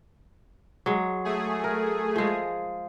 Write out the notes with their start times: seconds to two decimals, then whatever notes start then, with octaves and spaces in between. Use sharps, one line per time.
0.86 F#3 G#3
1.25 A3 G#4
1.64 A#4
2.16 F3 G#3